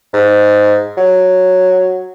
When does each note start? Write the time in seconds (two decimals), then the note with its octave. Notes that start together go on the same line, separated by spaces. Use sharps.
0.13 G#2
0.98 F#3